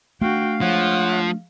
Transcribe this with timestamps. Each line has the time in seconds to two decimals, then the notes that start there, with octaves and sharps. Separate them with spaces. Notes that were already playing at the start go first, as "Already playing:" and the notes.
0.21 A3 D4 F#4 F5 G5
0.61 F3 G#3 C#5 F5 F#5